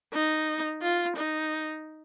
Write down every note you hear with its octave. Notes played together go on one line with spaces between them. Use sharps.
D#4
F4
D#4